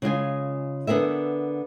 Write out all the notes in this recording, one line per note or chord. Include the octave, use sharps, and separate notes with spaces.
C#3 G#3 F4 G#5
D3 B3 G#4 A#4 E5